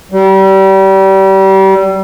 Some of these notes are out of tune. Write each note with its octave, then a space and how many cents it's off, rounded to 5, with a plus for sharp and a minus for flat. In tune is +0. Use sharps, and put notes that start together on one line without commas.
G3 -30